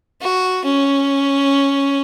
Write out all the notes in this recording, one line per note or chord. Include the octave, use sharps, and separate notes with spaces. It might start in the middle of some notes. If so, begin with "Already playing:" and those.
F#4
C#4